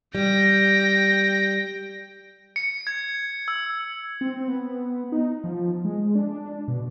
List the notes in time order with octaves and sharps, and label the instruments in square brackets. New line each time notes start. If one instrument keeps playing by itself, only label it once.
[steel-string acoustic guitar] G3 [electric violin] G5 A#6
[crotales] C#7
G#6
E6
[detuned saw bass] C4
B3
D#4
F3
G#3
D4
B2